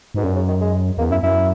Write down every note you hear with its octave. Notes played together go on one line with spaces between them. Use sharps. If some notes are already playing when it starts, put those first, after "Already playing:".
G#2 B2
F#2 A#2
C#3
D#3
G#3
E2 A#3
F#2 E4
F#2 E4